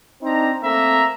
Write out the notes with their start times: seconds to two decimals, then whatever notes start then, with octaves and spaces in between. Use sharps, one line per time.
0.23 C4 D4 D#4 A#5
0.63 A3 A#3 C4 E5 A#5